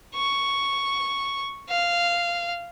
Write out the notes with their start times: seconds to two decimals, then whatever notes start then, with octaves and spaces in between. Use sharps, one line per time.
0.15 C#6
1.69 F5